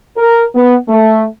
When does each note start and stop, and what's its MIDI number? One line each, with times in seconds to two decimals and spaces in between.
0.17 0.45 70
0.55 0.76 59
0.88 1.25 57